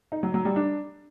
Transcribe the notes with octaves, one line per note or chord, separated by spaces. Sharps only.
D#4
F#3
F#3
G3
D4